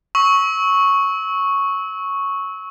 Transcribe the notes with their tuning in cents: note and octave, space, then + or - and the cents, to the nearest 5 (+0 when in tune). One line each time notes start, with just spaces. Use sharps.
C#6 +0 E6 -30